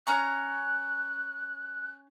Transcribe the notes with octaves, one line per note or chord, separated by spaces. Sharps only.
C#4 A#5 C#6 F#6